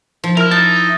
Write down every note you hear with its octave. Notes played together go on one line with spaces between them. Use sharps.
F3
E4 A#4 F6 F7
D#4 A5 A6